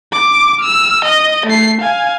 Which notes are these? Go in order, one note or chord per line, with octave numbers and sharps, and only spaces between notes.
D6
E6 F6
D#5
A3 C7
F5 G#5